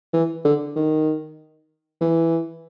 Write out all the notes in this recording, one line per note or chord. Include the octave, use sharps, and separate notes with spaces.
E3
D3
D#3
E3